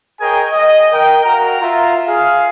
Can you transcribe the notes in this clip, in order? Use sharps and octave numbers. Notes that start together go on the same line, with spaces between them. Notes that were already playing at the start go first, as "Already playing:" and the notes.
G#4 A#4 C#5 D#5 G5 G#5
D#5
A#4 G5
F#4 A#4 F5 A#5
F4 E5 A#5
G#4 F5